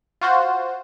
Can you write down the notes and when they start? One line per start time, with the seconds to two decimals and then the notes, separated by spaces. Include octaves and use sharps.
0.21 F4 F#4 C5